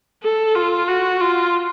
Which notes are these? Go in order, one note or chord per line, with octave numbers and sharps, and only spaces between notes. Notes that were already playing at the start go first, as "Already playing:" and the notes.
A4
F4
F#4
F4